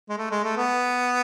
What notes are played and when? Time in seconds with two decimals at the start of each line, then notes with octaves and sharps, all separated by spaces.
0.09 G#3
0.18 A3
0.31 G#3
0.44 A3
0.57 B3